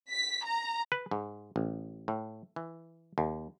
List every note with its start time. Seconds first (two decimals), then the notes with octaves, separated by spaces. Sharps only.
0.10 B6
0.45 A#5
0.92 B4
1.11 G#2
1.56 A1
2.08 A2
2.56 E3
3.18 D#2